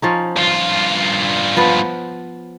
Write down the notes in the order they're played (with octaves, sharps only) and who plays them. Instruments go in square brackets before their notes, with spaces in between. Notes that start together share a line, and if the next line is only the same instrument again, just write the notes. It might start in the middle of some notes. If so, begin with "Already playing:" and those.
[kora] F3 C#4 D#4
[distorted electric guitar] G2 F4
[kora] F3 B3 B4